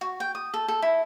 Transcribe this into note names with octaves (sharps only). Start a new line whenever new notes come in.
F#4
G5
D#6
A4
A4
E4